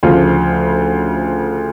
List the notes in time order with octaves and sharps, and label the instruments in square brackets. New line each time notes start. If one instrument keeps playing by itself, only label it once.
[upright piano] D2 C#3 F3 F4